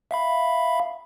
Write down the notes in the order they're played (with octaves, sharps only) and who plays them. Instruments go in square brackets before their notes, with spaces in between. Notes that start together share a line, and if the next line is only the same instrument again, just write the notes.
[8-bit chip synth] E5 F5 B5